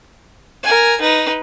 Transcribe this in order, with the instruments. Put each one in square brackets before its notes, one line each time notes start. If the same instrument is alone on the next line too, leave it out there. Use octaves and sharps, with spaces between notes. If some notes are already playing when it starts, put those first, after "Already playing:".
[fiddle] A#4 G#5
D#4 B4